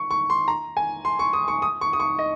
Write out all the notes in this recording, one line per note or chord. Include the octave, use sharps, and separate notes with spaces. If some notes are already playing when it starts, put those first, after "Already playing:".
Already playing: C#6
C#6
C6
A#5
G#5
C6
C#6
D#6
C#6
D#6
C#6
D#6
C#6
D#5